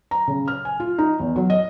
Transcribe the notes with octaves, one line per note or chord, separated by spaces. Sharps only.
A#5
C#3
F6
G#5
F4
D#4
E2
F#3
D#5